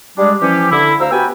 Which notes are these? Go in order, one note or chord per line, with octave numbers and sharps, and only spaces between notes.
G3 G#3 D4
E3 F3 C#4 G4
D3 E4
D2 C5 F5 A#5 E6
B3 F#4 G4 B4 G5 G#5